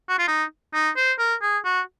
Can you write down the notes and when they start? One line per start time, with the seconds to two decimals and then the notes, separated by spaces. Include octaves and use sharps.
0.09 F#4
0.19 F4
0.28 D#4
0.74 D#4
0.96 C5
1.19 A#4
1.42 G#4
1.65 F#4